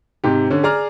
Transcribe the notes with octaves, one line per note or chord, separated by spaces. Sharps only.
G#2 C3 G4
D3 C#4
G#4 D5 A#5 F6